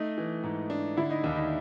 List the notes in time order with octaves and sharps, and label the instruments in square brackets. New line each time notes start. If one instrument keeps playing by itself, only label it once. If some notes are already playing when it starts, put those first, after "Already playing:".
Already playing: [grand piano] A3 [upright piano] D#4
[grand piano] E3
G#2
D4
[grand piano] D3 [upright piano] E4
[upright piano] D#4
[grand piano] D#2 [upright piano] D4
[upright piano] D#4